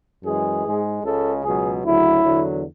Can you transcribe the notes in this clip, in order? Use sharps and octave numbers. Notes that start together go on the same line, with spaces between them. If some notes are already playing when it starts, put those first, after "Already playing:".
F#2 E3 G#3 G#4
G#2 G#3
C#2 C#3 G#3 A4
C#2 B2 F#3 G#4
D2 C#3 F#3 E4
E2 D3 F#3